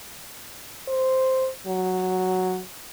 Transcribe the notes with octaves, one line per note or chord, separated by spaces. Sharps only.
C5
F#3